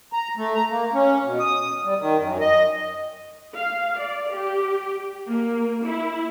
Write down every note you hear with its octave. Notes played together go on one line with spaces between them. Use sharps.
A#5
A3
A#5
A#3
C#4
B2
D#6
G3
D#3
F#2
D#5
F5
D5
G4
A#3
E4